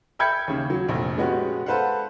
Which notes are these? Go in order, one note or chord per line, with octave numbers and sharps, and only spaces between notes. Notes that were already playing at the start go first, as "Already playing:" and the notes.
E5 G5 B5 G6 G#6 C#7
D#2 C#3
F#3
F1 A#1
G#3 B3 C#4 F#4 G4
A4 B4 C5 F5 F#5